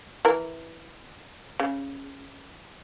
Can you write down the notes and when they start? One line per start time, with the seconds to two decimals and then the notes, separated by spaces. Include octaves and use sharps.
0.25 E3 A#4
1.60 C#3